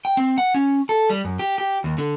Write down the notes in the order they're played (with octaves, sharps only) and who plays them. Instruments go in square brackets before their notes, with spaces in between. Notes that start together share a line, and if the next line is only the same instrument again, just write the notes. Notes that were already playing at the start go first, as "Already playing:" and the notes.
[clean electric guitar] G5
C4
F#5
C#4
A4
G3
F#2
G4
G4
D#2
D3